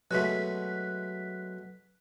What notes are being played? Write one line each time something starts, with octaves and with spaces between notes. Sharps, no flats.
B2 F#3 G#3 A3 F#6 B6